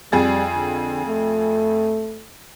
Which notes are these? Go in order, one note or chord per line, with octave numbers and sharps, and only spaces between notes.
F2 G3 G#4 A6
D3
A3